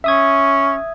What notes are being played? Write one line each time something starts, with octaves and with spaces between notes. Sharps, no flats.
C#4 E5 D#6 G#6